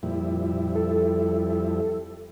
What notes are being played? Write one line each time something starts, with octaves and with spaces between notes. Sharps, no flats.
F2 A#2 G3 E4
A4